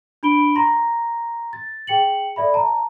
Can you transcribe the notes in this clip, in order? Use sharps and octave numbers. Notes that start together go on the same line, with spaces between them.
D4 B5 D7 G7
A#5 C6 A#6
A6
G#4 G5 C#7 F#7
A4 D5 E5 B5
A5 A#5